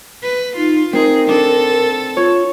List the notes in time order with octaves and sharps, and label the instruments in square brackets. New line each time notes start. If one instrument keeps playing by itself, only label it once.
[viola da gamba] B4
[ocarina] D#4 [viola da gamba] F4
[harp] C4 D#4 [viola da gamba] G#4 [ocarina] A#4
[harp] D4 [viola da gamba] A4
[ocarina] F4 [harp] C#5